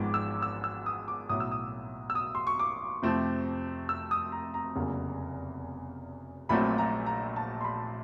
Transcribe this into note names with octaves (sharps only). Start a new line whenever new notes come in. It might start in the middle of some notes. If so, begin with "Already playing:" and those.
Already playing: G#1 G#2 F3 G#3 B3 D6
E6
E6
E6
D#6
D6
B1 A2 F#3 D#6
E6
D#6
E6
D#6
C6
C#6
D6
F2 C3 F3 A3 C4
E6
D#6
A#5
A#5
F1 E2 C#3 F#3 A#3
A#1 A#2 F#3 A3 C4 B5
A#5
A#5
A5
C6
B5